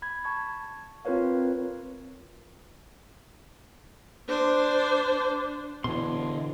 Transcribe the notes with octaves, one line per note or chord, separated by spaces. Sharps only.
B5 G#6
A5 C#6 G#6
C4 F4 A#4 B4 C#5 F5
D4 C5
B2 D3 E3 C6